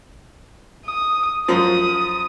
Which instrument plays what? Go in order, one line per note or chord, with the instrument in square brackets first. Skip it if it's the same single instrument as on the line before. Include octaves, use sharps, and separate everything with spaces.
[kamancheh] D#6
[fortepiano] F#2 F3 [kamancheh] D#6